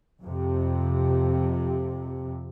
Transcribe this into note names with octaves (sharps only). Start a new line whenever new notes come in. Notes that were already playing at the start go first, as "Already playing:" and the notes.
F2 C3